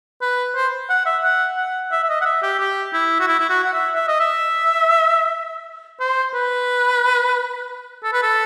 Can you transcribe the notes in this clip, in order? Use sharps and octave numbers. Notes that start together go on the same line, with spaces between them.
B4
C5
F#5
E5
F#5
F#5
E5
E5
D#5
F#5
E5
G4
G4
E4
F#4
E4
E4
F#4
F#5
E5
E5
D#5
E5
C5
B4
A4
B4
A4